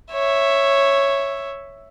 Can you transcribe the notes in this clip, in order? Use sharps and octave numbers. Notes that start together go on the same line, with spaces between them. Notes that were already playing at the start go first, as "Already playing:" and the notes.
C#5 E5